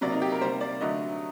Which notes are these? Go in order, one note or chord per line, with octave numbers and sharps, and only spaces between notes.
C3 F#3 A#3 D5
D#4
G4
A#4
C3 G3 A#3 C5
D5
D3 F#3 A3 D#5